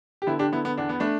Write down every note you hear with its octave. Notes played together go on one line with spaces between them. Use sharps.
G4
D3 B3 E4
D4 G4
D3 B3 E4
B3
E2 D4
B3
A3 D4